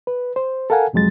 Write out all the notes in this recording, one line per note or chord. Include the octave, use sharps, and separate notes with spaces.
B4
C5
A4 A#4 F5 F#5 G#5
C2 F2 F#3 G#3 A6